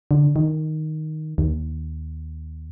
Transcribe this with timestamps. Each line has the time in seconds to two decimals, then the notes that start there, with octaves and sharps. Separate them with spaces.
0.11 D3
0.36 D#3
1.38 D#2